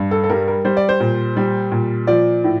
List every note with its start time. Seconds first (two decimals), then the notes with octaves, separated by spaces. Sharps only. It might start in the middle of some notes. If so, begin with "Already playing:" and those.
Already playing: G2
0.11 A4
0.24 A4
0.30 G3 A#4
0.48 A#4
0.65 G3 C5
0.77 D5
0.89 C5
1.00 A#2
1.37 G3
1.72 A#2
2.07 F3 D5
2.44 A2